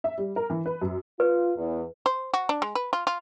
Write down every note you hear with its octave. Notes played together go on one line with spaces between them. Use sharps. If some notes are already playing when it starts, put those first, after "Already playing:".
E5
G3
A#4
E3
B4
F#2
F4 B4
E2
C5
F#4
D4
G#3
B4
F4
F4